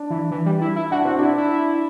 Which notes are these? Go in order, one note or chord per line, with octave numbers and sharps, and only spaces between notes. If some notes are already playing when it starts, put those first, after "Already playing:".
Already playing: D4
E3
E3
G3
E4
E4
D4 F#4
C4 F#4
D4 E4
E4